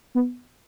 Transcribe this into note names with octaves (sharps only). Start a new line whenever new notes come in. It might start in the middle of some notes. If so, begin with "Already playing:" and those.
B3